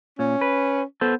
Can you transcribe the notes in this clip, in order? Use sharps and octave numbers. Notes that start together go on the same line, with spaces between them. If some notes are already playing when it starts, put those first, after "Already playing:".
A#2 C#4
B4
B3 A4 C5